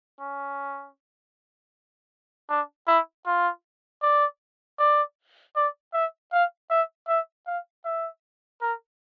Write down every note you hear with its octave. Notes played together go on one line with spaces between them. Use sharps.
C#4
D4
E4
F4
D5
D5
D5
E5
F5
E5
E5
F5
E5
A#4